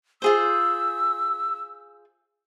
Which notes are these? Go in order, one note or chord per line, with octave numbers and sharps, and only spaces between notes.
F4 G#4 C5 E6